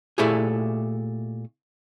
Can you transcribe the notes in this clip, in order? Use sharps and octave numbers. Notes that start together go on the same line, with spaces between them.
A#2 A3 E4 G4 G#4